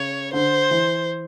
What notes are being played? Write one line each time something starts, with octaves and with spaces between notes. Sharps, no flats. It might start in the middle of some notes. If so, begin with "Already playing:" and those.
Already playing: C#3 C#5
D3 C5
E3